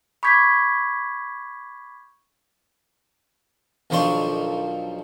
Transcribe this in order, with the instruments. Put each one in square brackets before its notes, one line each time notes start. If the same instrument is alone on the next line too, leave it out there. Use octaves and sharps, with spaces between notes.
[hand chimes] B5 C#6 D6 G6 G#6 B6
[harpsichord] B1 D#3 F3 D4 C6 C#6